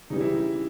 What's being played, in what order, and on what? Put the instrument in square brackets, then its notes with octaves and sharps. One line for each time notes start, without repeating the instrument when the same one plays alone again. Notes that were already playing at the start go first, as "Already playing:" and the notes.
[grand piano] C#3 E3 G3 D#4
E4